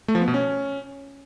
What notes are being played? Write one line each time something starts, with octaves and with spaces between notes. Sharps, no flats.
A3
F3
B3
B2
C#4